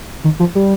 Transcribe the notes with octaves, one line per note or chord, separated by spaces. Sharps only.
D#3
F3
G3